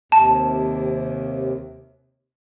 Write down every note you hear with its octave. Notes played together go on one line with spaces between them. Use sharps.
D#2 C3 A5